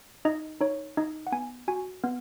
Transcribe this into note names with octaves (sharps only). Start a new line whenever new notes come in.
D#4 D#5
D#4 C#5
D#4 D#5
F#5
B3 G#5
F#4 G#5
B3